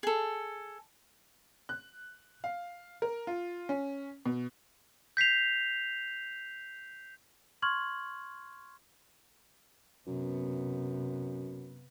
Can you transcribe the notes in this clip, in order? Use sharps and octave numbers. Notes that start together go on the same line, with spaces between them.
G#4 A4
F#6
F5
A#4
F4
C#4
B2
G6 B6 C7 F7
C6 C#6 F6 G#6 F#7
F#2 C3 B3